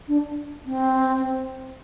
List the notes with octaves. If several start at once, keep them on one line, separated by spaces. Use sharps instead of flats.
D4
C4